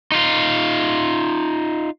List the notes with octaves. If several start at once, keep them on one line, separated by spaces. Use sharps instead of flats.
D#4 F4